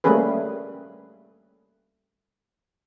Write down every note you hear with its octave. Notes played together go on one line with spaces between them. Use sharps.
G3 A3 A#3 C#4 G#4 B4